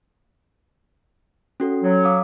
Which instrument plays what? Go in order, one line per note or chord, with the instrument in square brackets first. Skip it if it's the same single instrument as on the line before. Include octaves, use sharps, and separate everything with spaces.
[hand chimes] C#4 F#4 A4
[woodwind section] F#3
[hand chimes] F5 D6 D#6